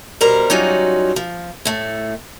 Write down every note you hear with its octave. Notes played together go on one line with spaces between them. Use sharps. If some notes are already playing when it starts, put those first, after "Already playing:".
B2 G3 A#4 C5 A#5
F#3 G3 C#4 D#4 F4 F#4
F3
A2 A3